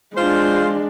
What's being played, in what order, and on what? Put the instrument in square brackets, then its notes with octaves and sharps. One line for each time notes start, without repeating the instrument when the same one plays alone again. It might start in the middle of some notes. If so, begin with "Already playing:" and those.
[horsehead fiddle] G#3 D4 [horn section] F4 C5